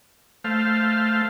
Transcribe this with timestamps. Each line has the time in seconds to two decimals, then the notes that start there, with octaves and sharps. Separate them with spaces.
0.44 A3 C5 F5